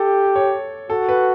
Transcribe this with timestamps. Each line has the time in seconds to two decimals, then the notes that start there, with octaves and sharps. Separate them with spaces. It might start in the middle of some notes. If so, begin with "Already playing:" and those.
Already playing: G4 A4
0.36 C#5
0.90 F#4 A4
1.09 B4